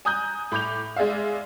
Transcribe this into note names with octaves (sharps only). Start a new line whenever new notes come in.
G#5 A#5 D#6 F#6 G6
A2 B5 D6 G6 F7
G#3 G#4 D5 E5 F5